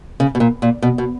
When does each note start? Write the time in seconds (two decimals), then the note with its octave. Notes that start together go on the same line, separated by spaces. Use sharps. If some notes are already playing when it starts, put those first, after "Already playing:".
0.20 C#3
0.35 B2
0.40 A#2
0.62 A#2
0.82 B2
0.98 B2